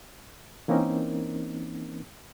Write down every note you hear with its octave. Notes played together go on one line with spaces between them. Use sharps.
E3 A#3 C4 C#4 D#4 A#4